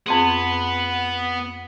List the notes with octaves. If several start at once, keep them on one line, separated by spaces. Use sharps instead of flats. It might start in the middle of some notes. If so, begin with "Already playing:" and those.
F2 B3 C4 G#4